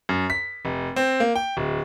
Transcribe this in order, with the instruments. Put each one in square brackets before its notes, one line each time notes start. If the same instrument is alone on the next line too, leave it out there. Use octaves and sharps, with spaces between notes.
[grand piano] F#2
B6
F1
C4
A#3
G5
D1